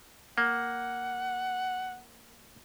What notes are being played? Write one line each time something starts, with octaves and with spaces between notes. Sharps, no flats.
A#3 F#5